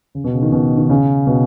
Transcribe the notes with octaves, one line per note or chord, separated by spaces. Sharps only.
C#3
B2
C#3
D#3
B2
D#3
C#3
B2